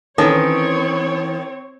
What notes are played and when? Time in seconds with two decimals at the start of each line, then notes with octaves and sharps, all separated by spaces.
0.18 D#3 E3 C4 C#4 A4 C#5 A5